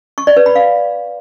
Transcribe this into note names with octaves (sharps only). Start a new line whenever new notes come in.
C#6
D5
B4
B5
F5